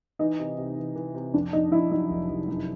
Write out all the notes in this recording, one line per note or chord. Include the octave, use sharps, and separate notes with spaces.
E3 D#4
C3
C3
E3
E3
C3
F2 D4
F2 D#4
F2 E4
F#3 D#4
F1
F1
F#2